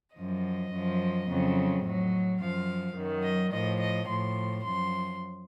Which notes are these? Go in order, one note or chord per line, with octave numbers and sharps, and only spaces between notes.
F#2 F3 D#5
F#2 F3
F2 C#3 F#3
A2 F#3
F#2 F3 F5
F#2 D#3 F#3
D#5
A2 F3 D#5
D#5
A2 F3 C6
F#2 F3 C6